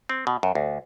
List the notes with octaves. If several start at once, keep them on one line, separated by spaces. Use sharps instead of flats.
C4
B2
F#2
D2